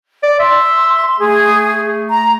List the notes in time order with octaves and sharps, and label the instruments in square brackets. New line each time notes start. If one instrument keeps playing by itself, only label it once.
[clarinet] D5
[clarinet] E5 [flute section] C6
[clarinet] A3 [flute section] G#4
[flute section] A#5